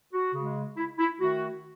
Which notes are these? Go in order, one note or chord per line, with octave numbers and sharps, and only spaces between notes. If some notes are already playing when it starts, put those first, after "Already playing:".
F#4
C#3 G#3
E4
E4
D#3 A3 F#4